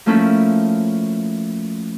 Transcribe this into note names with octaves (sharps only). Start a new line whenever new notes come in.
F3 A3 A#3 C#4 E4 A4